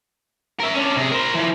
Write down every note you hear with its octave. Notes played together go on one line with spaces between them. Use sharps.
A#4 E5
C#4 D4
C3 G#4
A#4 C5
E3 F3